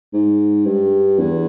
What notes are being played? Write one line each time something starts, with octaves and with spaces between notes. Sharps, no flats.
G#2
G2
E2